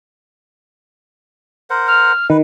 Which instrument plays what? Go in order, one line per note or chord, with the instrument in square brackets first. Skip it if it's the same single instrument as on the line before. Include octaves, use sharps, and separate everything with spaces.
[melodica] A#4 C5 F#5
[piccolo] F6
[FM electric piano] D#3 [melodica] B4